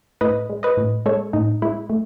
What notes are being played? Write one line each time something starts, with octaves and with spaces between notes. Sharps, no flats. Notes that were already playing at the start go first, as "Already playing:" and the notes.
A2 B4 D#5
G#3
B4 D#5
A2
G#3 A4 C#5
A2 D#4
G#3 E4
A3